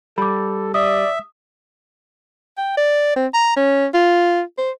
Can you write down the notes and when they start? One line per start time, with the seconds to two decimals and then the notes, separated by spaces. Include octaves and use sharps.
0.18 G3 A4 B5 D6
0.74 D5 E5 D#6
2.58 G5
2.77 D5
3.16 C4
3.34 A#5
3.56 C#4
3.94 F4
4.58 C5